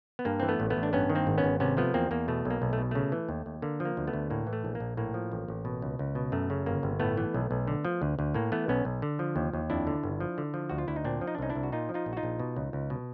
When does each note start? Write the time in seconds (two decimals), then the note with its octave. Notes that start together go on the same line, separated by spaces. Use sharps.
0.19 B3
0.25 G2 A#3
0.40 E3 C4
0.48 A3 B3
0.60 A1
0.70 A3 B3
0.77 A1
0.83 D4
0.93 G2 B3 C#4
1.10 D#3
1.15 A#3 C4
1.27 G#1
1.38 B3 C#4
1.44 G#1
1.60 C3 B3 C#4
1.77 F3 A3 B3
1.94 E2 A#3 C4
2.11 E2 A#3
2.28 B2 A3
2.45 B1
2.50 A#3
2.62 B1
2.73 A3
2.78 B2
2.91 C#3 A3
3.12 E3
3.29 D#2
3.46 D#2
3.62 D3 A#3
3.80 F3
3.85 A#3
3.97 D2
4.07 A3 B3
4.13 D2
4.30 A2 A#3
4.47 E3
4.53 A3
4.65 A#1
4.75 A#3
4.80 A#1
4.97 A2 A#3
5.14 F3
5.32 A1
5.48 A1
5.65 B2
5.82 C#2
5.99 C#2
6.15 B2
6.32 F#2 A3
6.50 C#3
6.66 G1 A#3
6.83 G1
7.00 A2 A3 B3
7.17 E3
7.34 B1
7.51 B1
7.67 D3
7.85 F3
8.02 D2
8.19 D2
8.34 A2 A#3
8.52 E3 A3 B3
8.68 B1 B3 C#4
8.85 B1
9.02 D3
9.19 F3
9.36 D#2
9.53 D#2
9.70 F2 D4 E4
9.87 D3
10.03 G1
10.20 F3
10.38 D3
10.54 F3
10.70 D2 F#4
10.78 F4
10.88 D2 E4
10.96 D#4
11.04 A#2 C4 D4
11.21 F3
11.27 D#4
11.35 D4
11.38 C2 C#4 D#4
11.50 D4 E4
11.55 C2
11.63 F#4
11.72 A#2 D#4 F4
11.89 F3
11.94 D#4 F4
12.06 A#1
12.13 F#4
12.17 D#4 F4
12.23 A#1
12.40 B2
12.56 C#2
12.73 C#2
12.90 B2